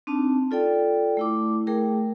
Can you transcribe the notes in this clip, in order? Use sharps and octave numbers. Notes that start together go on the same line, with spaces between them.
C4 D4 D#4 A5
F4 A4 D5 G5
A3 E4 D6
A3 G#4 A#4 G5